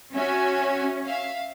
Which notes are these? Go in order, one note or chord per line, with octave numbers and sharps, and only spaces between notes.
C#4 F#4 E5 G#5
E5 F5